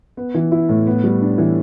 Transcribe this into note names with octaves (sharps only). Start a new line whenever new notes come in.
B3
E3
E4
A2
B3
G3
D4
E3